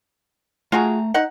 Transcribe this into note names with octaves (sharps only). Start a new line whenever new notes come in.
A3 F4 F#4 G#4 A#5
D#4 F#5